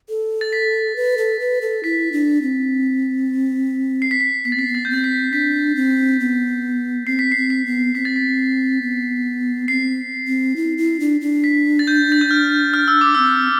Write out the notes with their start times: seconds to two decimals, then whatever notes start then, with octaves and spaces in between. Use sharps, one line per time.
0.09 A4
0.41 A6
0.53 B6
0.96 B4
1.18 A4
1.40 B4
1.61 A4
1.84 E4 B6
2.12 D4
2.42 C4
4.02 C7
4.11 B6
4.20 C7
4.45 B3 B6
4.52 A6
4.56 C4 B6
4.68 B3
4.75 A6
4.85 G6
4.90 C4 A6
5.04 B6
5.32 D4 B6
5.76 C4
6.20 B3
7.07 C4 C7
7.19 B6
7.32 C4 C7
7.50 B6
7.66 B3
7.95 C4 B6
8.05 A6
8.16 B6
8.82 B3
9.68 C4 C7
10.27 C4
10.56 E4
10.78 E4
11.00 D4
11.21 D4
11.44 B6
11.79 A6
11.87 G6
12.12 A6
12.21 G6
12.31 F6
12.74 F6
12.88 E6
13.01 D6
13.15 C4 E6